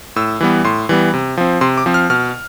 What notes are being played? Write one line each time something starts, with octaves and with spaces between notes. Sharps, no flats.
A2 E6
E3 G3 B3
A2 C6
E3 G3 B3
C3
F3 C4
C3 C6
D6
F3 C4
F6
B2 F6